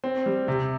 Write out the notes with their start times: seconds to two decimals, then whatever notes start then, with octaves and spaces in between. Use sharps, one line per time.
0.04 C4
0.26 G3
0.48 C3